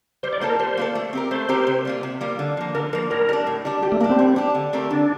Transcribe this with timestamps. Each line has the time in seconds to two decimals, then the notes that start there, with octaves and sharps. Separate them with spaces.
0.23 G3 C5
0.33 D5
0.41 A#3 F4 A4 C5
0.50 A#4
0.59 G3 C5
0.77 A#3 F4 A4
0.95 A3
1.13 C4 G4 A#4
1.31 A3 C5
1.49 C4 G4 A#4
1.67 C3
1.85 G3 A#3 F4
2.03 C3
2.21 G3 A#3 F4
2.39 D3
2.57 F3 A#3
2.75 D3 A#4
2.93 F3 A#3 A#4
3.10 A2 A#4
3.29 G3 D4
3.47 A2
3.65 G3 D4
3.83 G3 G4
3.92 A3
4.00 A#3 D4
4.04 G4
4.10 C4
4.19 G3
4.36 D4 G4
4.55 D3
4.73 A3 C4 G4 A#4
4.91 D3 D4